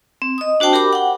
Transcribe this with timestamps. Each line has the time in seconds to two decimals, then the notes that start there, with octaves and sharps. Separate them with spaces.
0.22 C4
0.38 D#5 D#6
0.60 D4 F#4 C5 G5 A5
0.73 G4 A#4 B5 D6
0.93 F#5 G5